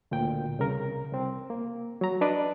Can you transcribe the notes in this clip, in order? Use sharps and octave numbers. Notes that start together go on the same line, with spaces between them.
D2 A#2 G5
C2 C#3 A#4
C2 C4
A#3
F#3 A#5
D4 B4 D5 D#5